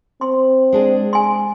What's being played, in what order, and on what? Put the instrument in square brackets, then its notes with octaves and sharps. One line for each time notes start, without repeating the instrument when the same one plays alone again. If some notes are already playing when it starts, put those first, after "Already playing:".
[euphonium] C4 [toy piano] C6
[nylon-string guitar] G#3 D4 G#4
[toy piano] G#5 C6